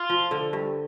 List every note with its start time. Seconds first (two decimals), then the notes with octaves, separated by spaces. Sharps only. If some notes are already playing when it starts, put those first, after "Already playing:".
Already playing: F4
0.09 F3
0.31 D3
0.53 G2